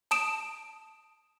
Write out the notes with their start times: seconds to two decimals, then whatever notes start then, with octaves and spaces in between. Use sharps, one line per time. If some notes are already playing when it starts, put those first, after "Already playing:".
0.11 A5 D#6 D7 E7